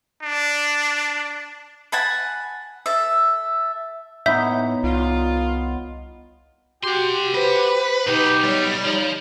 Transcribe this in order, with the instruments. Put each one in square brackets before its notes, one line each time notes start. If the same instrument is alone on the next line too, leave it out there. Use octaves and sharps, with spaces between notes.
[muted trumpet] D4
[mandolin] F#5 G#5 A5 B5
A4 E5
[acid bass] A2 [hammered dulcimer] B3 D#4 C#5 [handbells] E5 G6
[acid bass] C2 [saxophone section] F4
[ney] F#4 [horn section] G4 [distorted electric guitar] F#5 C6
[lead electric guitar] B4 [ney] C5
[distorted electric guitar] B1 B2 [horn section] D#4 G4
[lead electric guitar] G3 [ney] C#5
[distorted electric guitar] F3 [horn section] D#4